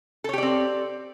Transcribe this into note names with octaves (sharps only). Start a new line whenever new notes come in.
C4 G4 A4 C#5 D5